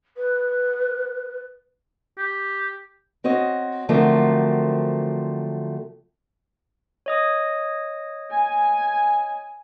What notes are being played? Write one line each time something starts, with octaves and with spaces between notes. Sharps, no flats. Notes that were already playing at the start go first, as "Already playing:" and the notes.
B4
G4
C4 F#4 C#5 D#5
D3 F3 F#3 A3 A#3 C4
C#5 D#5 D#6
G#5